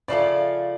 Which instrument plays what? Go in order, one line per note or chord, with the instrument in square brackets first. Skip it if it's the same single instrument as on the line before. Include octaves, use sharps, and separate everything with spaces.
[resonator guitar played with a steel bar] C#3 F3 A3 F4 A4 [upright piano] D5